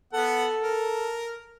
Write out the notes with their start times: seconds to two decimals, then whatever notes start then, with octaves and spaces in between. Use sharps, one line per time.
0.13 B3 A4 F#5
0.62 A#4